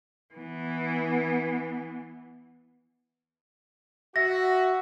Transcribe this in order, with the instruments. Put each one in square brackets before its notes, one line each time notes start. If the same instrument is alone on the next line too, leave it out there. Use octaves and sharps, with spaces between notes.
[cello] E3 B3
[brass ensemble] F#4 [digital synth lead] E5 [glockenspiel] A#6